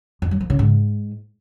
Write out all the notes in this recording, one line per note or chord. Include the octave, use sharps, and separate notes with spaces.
F2
F#3
F3
C#3
G#2